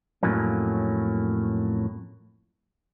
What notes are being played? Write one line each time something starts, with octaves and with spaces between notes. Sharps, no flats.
F2 A2 F#3 A#3 C#4